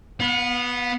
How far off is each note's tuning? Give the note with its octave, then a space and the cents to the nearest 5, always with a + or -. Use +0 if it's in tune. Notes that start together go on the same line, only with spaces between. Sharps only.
B3 -5 F5 +45